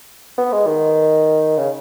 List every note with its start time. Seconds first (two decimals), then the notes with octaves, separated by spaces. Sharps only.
0.38 B3
0.52 G#3
0.67 D#3
1.58 C#3